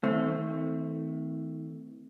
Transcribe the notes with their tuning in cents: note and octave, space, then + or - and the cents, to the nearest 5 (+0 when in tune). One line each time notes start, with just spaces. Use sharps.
D#3 +40 A3 +0 C4 -25